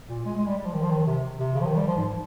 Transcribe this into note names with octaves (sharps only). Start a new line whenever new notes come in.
A#2
G#3
G#3
G3
G3
F3
D#3
F3
D#3
C3
C3
C#3
F3
D#3
G3
F3
G#2